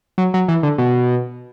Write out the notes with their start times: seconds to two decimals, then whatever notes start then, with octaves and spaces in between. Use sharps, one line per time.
0.18 F#3
0.34 F#3
0.48 E3
0.63 D3
0.78 B2